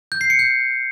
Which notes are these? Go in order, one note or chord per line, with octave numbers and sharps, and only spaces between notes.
G6
C7
C#7
G6